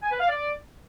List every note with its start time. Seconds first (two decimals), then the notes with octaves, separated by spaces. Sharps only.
0.02 G#5
0.11 B4
0.20 F5
0.29 D5